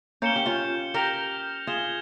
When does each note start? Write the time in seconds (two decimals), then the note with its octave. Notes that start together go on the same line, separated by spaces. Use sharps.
0.22 A#3 C#4 G6 C#7 E7 G7
0.36 G4
0.46 C#4 F4
0.94 G4 A#4 F6 A#6 F7
1.67 F4 G#4 G#6 E7 G7